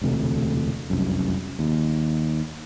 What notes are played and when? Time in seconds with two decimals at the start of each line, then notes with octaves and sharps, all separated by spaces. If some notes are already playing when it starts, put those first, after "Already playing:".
0.02 E1 D2 C3 A3
0.90 F1 C2 F#2
1.59 D#2